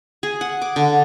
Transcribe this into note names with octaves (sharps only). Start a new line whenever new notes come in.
G#4
F#5
D6
D3